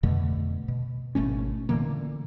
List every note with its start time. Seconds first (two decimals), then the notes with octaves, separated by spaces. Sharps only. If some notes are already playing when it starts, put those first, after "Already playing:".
0.03 F2 B2 D3 A3
0.68 B2
1.15 G#1 B2 A3 C#4
1.69 A#2 D3 E3 A#3